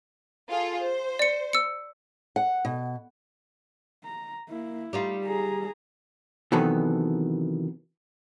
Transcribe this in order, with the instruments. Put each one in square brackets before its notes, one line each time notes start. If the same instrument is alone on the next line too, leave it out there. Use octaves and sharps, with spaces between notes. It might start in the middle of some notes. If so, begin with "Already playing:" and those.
[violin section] F4 G#4 A4
C5
[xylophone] D5 C#7
E6 C#7
[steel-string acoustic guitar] F#5
B2
[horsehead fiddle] A#5
A#3 E4
[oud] G3 D#4 F4 [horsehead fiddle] A3
[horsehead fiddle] G#4 A#5
[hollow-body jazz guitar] C3 D#3 E3 F#3 B3 A4